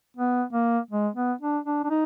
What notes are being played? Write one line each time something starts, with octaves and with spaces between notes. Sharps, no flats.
B3
A#3
G#3
B3
D4
D4
D4
D#4